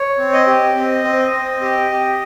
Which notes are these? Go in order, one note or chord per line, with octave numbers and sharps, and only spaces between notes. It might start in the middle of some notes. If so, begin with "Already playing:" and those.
Already playing: C#5
C4
D#5
G4
C4
C4
C4
G4
G4